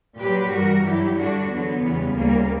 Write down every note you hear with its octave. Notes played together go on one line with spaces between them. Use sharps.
A#2 F#3 G4 B4
G2 E3 G3 F#4 A#4
G2 F#3 E4 G4
G2 D3 G3 D4 F#4
E2 D3 F#3 B3
E2 C#3 E3 G3
D2 C#3 G3 A#3